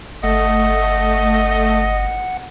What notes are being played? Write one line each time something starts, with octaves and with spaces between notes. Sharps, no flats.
G1 A3 D#5 F#5